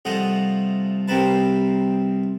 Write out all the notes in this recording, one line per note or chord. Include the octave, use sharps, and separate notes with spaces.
C2 F3 A3 D#5 F#5
C2 C3 C4 A#4 B4 A5